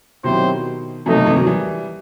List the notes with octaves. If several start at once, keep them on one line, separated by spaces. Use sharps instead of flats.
B2 D#3 F#3 C4 E4 G4 C5
C3 E3 F#3 A3 D#4 A4
B2 D#3
C3 E3
D#3 F#3
E3 G3